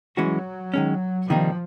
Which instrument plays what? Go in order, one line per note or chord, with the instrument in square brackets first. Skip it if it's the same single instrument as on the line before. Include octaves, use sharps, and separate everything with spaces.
[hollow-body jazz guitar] E3 G#3 C#4 F#4 [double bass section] F#3
[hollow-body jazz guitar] D#3 G#3 C#4
[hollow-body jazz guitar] C3 D#3 G3 A#3 D#4 [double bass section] F3